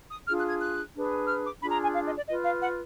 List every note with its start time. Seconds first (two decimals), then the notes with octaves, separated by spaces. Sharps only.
0.10 D#6
0.27 D4 F4 G#4 F6
0.39 F#6
0.49 G#6
0.61 F#6
0.94 D4 G#4 B4
1.28 F6
1.45 D6
1.60 D4 F4 G#4 B5
1.71 A#5
1.83 G#5
1.95 F5
2.06 D#5
2.17 D5
2.28 F4 B4 D#5
2.45 F5
2.61 F#5